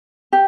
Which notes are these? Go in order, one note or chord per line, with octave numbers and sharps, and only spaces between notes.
G4